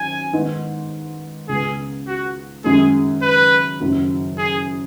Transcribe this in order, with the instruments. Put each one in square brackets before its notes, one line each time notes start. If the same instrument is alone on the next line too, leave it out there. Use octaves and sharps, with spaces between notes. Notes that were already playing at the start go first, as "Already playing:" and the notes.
Already playing: [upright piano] G#1 F#2 D#3 [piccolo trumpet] G#5
[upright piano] G#2 D#3 B3 D#4
[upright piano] C#2 C#3 B3 [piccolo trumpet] G#4
[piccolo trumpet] F#4
[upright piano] F#2 D#3 G#3 C#4 [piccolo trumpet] G#4
[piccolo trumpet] B4
[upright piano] F#1 F#2 D#3 F#3
[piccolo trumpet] G#4